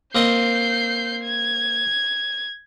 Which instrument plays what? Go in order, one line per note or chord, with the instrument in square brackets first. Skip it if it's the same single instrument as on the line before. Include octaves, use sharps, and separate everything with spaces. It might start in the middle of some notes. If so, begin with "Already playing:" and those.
[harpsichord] A#3 C4 D#5 [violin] G6 C7
[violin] G#6